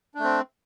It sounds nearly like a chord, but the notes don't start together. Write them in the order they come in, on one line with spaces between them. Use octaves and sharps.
D4 A3 C4